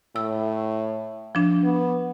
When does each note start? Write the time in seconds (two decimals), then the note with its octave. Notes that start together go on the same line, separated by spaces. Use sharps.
0.16 A2 E6
1.35 F3 D4
1.64 B3